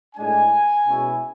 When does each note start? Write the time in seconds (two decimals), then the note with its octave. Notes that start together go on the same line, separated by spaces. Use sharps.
0.16 A2 G#3 D4 G#5
0.85 B2 G#3 C#4 E4